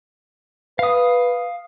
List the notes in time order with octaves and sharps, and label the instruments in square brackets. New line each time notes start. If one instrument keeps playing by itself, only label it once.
[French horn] B4 [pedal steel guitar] F5 D#6